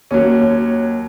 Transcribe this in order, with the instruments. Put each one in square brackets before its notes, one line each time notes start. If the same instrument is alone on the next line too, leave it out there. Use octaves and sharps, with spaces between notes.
[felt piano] D#2 [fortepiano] F#3 C#4